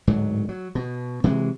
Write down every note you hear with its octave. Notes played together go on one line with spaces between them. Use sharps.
D1 G#2 F#3
F#3
B2
C3 E3 F#3 G#3